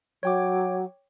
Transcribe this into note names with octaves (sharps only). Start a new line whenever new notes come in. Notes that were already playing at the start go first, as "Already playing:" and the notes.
F#3 C#5 G5 D6